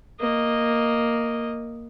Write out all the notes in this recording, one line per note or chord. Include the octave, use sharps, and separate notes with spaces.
A#3 D#5